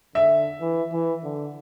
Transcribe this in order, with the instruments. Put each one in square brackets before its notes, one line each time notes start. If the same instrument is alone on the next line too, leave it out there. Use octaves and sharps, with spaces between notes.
[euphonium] D3 [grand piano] E5
[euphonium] E3
E3
D3